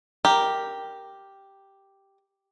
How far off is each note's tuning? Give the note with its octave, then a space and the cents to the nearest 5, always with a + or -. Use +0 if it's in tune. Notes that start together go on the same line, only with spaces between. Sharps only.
G4 +0 A#4 +0